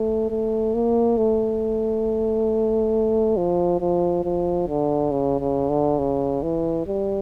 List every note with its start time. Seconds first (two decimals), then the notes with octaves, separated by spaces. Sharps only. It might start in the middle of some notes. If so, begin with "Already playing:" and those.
Already playing: A3
0.30 A3
0.74 A#3
1.18 A3
3.37 F3
3.81 F3
4.24 F3
4.68 D3
5.11 C#3
5.40 C#3
5.69 D3
5.99 C#3
6.43 E3
6.87 G3